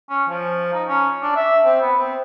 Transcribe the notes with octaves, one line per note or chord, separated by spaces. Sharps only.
C#4
F3
D#4
C#4
D4
E5
C4
B3
C4